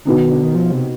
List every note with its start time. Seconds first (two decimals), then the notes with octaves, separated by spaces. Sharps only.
0.05 B2 D3 B3 D#4
0.17 D#3
0.30 D3
0.43 D#3
0.55 F3
0.72 C3